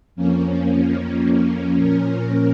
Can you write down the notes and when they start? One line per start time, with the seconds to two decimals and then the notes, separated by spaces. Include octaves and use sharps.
0.15 F2 F3 A#3 C#4
1.76 A#2 F3 C#4 A#4